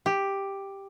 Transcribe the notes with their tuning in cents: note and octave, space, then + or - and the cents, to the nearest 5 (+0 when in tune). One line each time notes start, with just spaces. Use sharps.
G4 +5